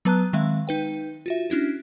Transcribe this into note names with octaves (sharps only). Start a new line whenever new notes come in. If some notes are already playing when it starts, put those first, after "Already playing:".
F#3 B3 B4 A5 A#5 F#6
D#3 G#3 C4 E5 F5
D#4 B4 G5
F4 F#4 E5
C#4 D4 E4 F#4